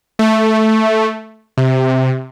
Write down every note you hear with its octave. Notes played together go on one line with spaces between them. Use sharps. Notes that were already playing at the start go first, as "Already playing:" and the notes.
A3
C3